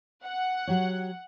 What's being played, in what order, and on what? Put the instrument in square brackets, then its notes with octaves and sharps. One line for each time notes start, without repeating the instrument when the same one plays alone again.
[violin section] F#5
[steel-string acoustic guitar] F#3 G4 C#5